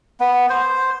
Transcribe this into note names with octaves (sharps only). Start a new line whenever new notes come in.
B3
C5